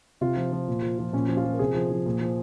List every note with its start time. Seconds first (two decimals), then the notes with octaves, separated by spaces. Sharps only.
0.21 C3 F4
0.36 F3
0.52 F3
0.68 A#2
0.82 F3
0.99 F3
1.13 A#2 C#4
1.29 F3
1.37 F4
1.45 F3
1.53 A#4
1.59 C3 G#4
1.74 F3
1.91 F3
2.06 A#2
2.21 F3